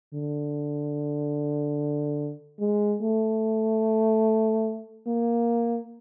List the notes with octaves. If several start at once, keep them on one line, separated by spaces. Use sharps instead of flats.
D3
G#3
A3
A#3